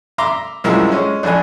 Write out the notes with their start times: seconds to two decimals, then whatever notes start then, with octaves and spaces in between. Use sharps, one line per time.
0.18 E5 A#5 C6 D6
0.64 C2 F#2 F3 G#3 E4 A#4
0.92 G#3 C#4
1.23 A#1 F2 D4 G#5